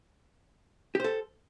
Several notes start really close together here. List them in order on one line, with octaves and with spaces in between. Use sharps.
G4 C5 A4